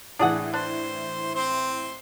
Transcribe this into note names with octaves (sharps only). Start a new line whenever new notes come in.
A2 E3 D4 G#4 F#5
D4 C5
C4 C5